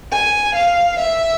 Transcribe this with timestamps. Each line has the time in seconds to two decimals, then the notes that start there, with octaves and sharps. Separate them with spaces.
0.12 G#5
0.56 F5
1.00 E5